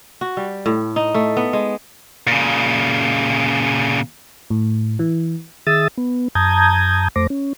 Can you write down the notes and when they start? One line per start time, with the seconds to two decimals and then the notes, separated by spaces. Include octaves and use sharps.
0.21 F#4
0.37 G3
0.66 A2
0.96 D#4
1.14 A3
1.37 B3
1.53 G#3
2.27 A#2 C#3
4.50 A2
4.99 E3
5.67 D#3 G#4 E5 D#6 E6 A6
5.97 B3
6.35 F#2 A5 A#5 D#6 G6 G#6
7.16 F2 A3 C5 D6 A#6
7.30 C#4